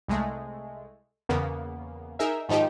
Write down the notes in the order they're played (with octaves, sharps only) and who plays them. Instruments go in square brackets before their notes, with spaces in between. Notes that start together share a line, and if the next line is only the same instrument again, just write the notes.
[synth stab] C2 G#3 A3
E2 C#3 A#3 B3
D#4 G#4 A#4 E5
G#2 D#3 F3 D#4 G4